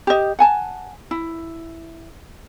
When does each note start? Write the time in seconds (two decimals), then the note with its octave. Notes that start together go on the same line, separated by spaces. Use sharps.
0.07 G4 D#5
0.39 F#5 G#5 A5
1.11 E4